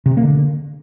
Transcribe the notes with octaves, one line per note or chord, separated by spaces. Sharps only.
C3
C#3
A#3
D3